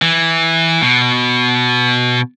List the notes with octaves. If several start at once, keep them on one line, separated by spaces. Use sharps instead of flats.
E3
B2